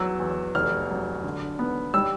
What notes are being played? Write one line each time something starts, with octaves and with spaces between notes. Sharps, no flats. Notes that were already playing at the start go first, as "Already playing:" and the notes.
Already playing: E2 F#3 E6
E2
F1 F6
F#3
D3
B3
G3 E6